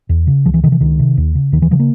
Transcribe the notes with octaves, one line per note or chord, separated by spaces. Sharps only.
E2
C#3
C#2 F3
E3
C3 D#3
E3
C#2 D#3
C3
D#2
C#3
D#2 D#3
E3
C#3 F3
A#3